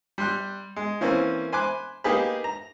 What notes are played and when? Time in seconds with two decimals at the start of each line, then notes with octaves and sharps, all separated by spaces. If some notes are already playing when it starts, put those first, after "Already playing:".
0.18 G3 C6 F#6
0.76 G#3
1.01 E3 A#3 C4 C#4
1.52 C5 G#5 B5 D6 F#6
2.04 A#3 D#4 G4 G#4 B4
2.44 A#5